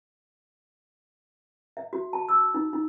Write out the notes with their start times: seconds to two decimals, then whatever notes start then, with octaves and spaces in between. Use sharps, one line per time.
1.77 E5
1.93 F#4
2.13 A5
2.29 E6
2.54 D#4
2.73 D#4